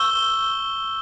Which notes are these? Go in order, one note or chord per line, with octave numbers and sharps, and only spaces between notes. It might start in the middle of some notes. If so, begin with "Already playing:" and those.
Already playing: C#6 E6 G6 G7